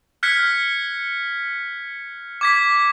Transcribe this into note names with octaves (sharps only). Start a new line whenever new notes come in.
F6 F#6 G#6 B6 C#7
D6 G#6 B6